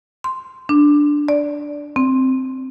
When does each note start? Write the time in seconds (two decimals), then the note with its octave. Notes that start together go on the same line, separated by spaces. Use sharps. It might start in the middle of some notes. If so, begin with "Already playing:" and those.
0.24 C6
0.69 D4
1.28 D5
1.96 C4